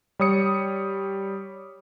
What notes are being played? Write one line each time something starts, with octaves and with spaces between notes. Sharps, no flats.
G3 C#5 D#6 C#7